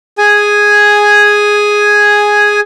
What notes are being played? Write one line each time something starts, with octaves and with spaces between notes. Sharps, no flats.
G#4 G#5